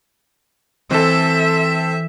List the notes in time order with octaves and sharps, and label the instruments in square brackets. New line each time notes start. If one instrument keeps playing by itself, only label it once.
[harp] E3 [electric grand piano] C4 A4 [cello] E5